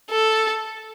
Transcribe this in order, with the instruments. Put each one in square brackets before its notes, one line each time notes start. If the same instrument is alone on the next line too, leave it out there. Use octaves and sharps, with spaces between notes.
[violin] A4